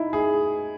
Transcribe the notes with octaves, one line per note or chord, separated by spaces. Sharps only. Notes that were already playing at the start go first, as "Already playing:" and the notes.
Already playing: D#4 E4
G#4